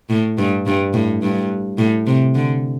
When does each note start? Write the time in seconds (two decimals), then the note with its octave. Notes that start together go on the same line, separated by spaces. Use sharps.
0.10 A2
0.38 G2
0.66 G2
0.94 A2
1.23 G2
1.78 A2
2.07 C3
2.35 D3